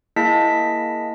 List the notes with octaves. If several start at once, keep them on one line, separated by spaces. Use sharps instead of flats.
A#3 E4 G#4 D#5 A5 B6